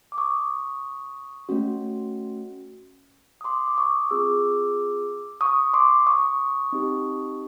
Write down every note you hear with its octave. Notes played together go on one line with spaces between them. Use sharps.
D6
C#6 D#6
A3 C#4 F#4
D#6
C6 D6
D6
C#6 D#6
C4 F4 G#4 D6 E6
C#6 D#6
C6 D6
C#6 D#6
C4 D#4 G4